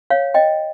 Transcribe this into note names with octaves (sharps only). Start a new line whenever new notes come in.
C#5 F5
D#5 G5